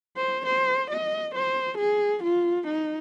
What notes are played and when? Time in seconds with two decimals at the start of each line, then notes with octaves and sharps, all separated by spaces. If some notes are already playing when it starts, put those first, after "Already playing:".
0.17 C5
0.46 C5
0.91 D#5
1.35 C5
1.79 G#4
2.23 F4
2.67 D#4